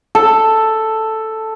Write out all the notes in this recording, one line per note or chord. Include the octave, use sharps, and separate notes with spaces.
A4